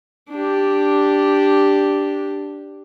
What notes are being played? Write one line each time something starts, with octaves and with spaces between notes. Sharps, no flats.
D4 G4